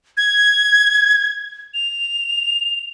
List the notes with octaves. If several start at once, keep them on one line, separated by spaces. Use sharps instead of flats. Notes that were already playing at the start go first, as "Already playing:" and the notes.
G#6
F7